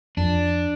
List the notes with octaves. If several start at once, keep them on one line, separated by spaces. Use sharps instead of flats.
F2 D4